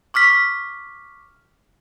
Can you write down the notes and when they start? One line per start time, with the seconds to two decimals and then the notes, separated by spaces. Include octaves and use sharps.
0.14 C#6 D6 F6 B6